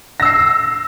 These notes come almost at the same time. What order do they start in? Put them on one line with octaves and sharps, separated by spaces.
A#6 E6 C7